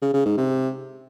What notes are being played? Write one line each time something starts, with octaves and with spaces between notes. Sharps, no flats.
C#3
C#3
G#2
C3